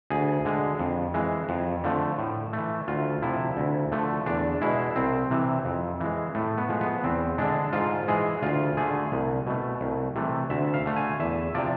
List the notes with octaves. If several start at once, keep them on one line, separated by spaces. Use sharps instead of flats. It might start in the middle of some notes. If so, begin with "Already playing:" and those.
D2 G#4
D3 G#3
F2
E3 G#3
F2
D3 F3 A3
A2
E3 A3
D2 F4
C3 F3 E4
D2
D3 F3 A3
E2 D4
B2 G#3 E4
C2 C4
C3 E3
F2
E3 G#3
A2 A3
B3
F3 G#3
B3
E2 C4
D3 G#3 D4
G#2 F4
E3 G#3 G#4
D2 F4
D3 A3 G#4
C2
B2 A3
C2
C3 E3 A3
D2 E5
F5
D3 A3
G#5
E2 E5
C3 F3 D5